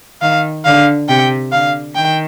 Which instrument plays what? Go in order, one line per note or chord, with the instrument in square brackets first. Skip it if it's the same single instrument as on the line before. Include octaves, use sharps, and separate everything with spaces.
[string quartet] D#3 [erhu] F5
[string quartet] D3 [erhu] F5
[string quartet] C3 [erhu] G5
[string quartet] D3 [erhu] F5
[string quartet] D#3 [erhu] G5